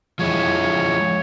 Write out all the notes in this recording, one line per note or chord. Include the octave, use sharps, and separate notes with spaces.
F3 G#3 E4 C#5